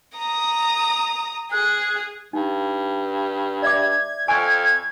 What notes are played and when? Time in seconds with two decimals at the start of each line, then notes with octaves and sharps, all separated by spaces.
0.18 A#5 D#6
1.52 G#4 F#6
2.33 G2 D#4
3.62 D5 E5 D6 G#6
4.28 F2 G#5 C#6